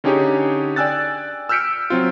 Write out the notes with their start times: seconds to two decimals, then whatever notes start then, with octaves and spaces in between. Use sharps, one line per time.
0.04 D3 C#4 D#4 G4 G#4 C#5
0.76 D5 G5 G#5 E6 F#6 A6
1.49 E6 F6 G6 B6 C#7 D7
1.90 F#3 C4 F4